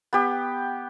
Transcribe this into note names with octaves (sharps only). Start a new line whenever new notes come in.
B3 G4